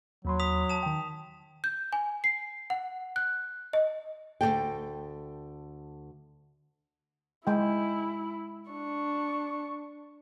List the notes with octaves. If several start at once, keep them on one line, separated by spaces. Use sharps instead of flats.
D#2 F#3 B5 C6
D#6 B6 F7
A5 E7
D#3 G5
G6
G#5
C7
F#5
F#6
D#5
D2 C3 A4 G5
G#3 E4 G5
D4 C#6